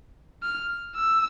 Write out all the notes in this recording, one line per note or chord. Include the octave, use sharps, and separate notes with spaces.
F6
E6